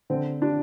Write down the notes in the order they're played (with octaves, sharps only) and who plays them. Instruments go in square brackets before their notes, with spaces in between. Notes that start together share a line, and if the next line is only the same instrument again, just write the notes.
[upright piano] D3 C4
D4